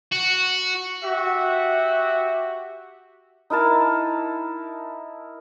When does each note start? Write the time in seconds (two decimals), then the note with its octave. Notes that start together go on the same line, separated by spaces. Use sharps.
0.12 F#4
1.04 F#4 G4 E5
3.50 D#4 E4 A#4 A5